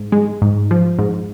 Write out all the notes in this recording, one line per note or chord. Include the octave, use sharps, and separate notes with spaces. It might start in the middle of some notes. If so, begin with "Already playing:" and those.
Already playing: G#2
G#3
G#2
F3
G#2